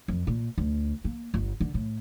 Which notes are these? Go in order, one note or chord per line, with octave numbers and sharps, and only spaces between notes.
F2
A#2
D2
A#3
G1
D3
A2